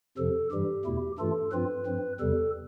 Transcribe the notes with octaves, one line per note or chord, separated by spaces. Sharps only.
F2 C3 F3 A4
G2 E3 G3 G4
E2 B2 A3 E4
G2 E3 A3 D4 F4 A4
G2 F3 C4 F4 B4
G2 F3 C4
E2 C3 G3 A4